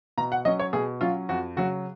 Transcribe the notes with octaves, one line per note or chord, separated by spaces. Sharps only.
B2 A#5
F#5
F#3 C#4 D#5
C#5
B2 G#4
F#3 C#4 F4
F2 F#4
C#3 F#3 F#4